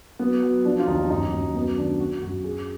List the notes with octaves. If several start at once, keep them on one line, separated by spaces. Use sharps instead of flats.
F#3 B3
F#3
F3 D4
F4
D#2 D#4
F#2 D#4
F#2
F#3 B3
D#3 D4
F#3 F#4
F#2 F#4
F#3 G#4